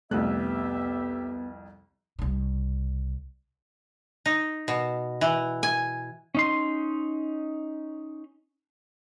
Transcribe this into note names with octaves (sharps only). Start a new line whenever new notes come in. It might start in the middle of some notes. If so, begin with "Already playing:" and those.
C2 F2 A3 B3 G4 E5 F#6
C2 C#3
D#4
B2
E3
G#5
C#4 D#4 C6